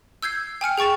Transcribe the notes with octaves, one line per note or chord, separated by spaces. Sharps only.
E6 G6 G#6 C7
G5 G#5 F6 C#7
G#4 G5 C#6 A6 E7